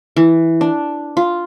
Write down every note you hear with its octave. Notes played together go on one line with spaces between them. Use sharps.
E3
D4
F4